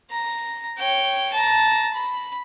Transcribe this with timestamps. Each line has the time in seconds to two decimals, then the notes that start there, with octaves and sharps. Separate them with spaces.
0.11 A#5
0.78 C#5 G5
1.34 A5 A#5
1.95 B5